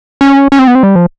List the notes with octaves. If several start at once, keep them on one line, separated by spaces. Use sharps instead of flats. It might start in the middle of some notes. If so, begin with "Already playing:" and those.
C#4
C#4
C4
B3
C4
G3
F3